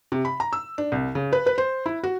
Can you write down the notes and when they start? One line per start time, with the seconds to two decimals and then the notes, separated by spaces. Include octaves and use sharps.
0.12 C3
0.25 B5
0.40 A#5
0.53 E6
0.78 D4
0.92 C2
1.15 C#3
1.33 B4
1.46 B4
1.58 C5
1.86 E4
2.03 F#4